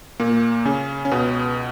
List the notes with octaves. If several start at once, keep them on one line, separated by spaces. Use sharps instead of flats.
A#2 A#3
C#3 C#4
C#4
C#2 B2 B3